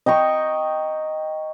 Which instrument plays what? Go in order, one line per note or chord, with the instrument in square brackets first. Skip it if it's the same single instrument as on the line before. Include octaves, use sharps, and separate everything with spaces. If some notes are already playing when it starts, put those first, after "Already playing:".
[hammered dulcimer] D#5 G5 A#5 C#6